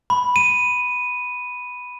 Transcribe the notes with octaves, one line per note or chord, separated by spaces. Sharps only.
B5
D#7